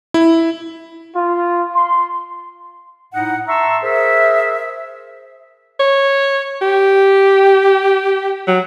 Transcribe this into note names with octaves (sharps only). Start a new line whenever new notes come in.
E4
F4
C6
A2 D#4 F#5
E5 A5 A#5 C6 C#6 E6
G#4 A#4 C5 E5
C#5
G4
F#3